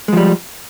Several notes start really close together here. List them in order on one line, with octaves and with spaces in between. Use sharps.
G#3 F3 G3